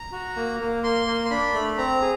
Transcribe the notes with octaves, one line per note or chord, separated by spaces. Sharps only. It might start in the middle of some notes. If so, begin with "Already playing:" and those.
Already playing: A#5
F#4
A#3
A#3
A#3 C6
A#3
C6
D4 B5
A3
C4 A#5
G#4